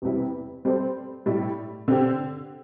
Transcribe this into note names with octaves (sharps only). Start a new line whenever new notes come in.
E2 C3 G3 E4
G3 C4 A4 C5
A2 G3 E4
D3 C4 G4